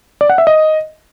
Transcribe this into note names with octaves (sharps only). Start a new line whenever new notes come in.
D5
F#5
E5
D#5